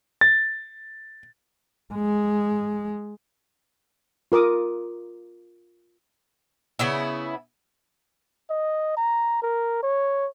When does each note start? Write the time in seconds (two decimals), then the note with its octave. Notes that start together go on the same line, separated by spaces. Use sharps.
0.21 A6
1.94 G#3
4.32 F4 A#4 D6 D#6
6.79 C#3 B3 E4
8.50 D#5
8.97 A#5
9.42 A#4
9.83 C#5